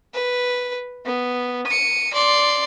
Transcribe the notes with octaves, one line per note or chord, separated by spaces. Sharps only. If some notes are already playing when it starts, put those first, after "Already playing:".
B4
B3
C#7 D#7
D5 C6